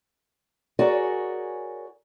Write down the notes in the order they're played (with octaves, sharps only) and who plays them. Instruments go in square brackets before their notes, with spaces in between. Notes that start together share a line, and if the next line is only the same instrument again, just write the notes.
[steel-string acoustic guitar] F#4 G#4 A#4 C#5 D5 G#5